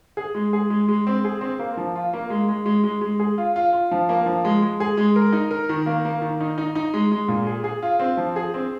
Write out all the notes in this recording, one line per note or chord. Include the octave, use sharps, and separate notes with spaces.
G#4
G#3
G#4
G#3
G#3
C4
G#4
C4
A#3
F3
F4
A#3
G#3
G#3
G#3
G#3
G#3
G#4
F4
F4
F4
F3
A#3
F3
G#3
G#3
G#4
G#3
A#4
D#4
A#4
D#3
A#3
A#3
D#3
D#4
D#4
D#4
G#3
G#3
A#2
G#4
G#4
F4
C4
F3
G#4
C4